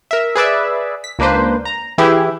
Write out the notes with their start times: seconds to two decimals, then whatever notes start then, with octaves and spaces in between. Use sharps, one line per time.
0.11 A#4 E5
0.35 G#4 B4 D5 E5
1.04 B6
1.19 C#2 A#3 D4 B4 C5
1.65 A#5
1.98 E3 E4 G4 G#4